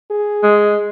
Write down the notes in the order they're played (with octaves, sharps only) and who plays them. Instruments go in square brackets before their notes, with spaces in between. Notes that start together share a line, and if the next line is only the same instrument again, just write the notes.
[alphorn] G#4
[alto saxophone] G#3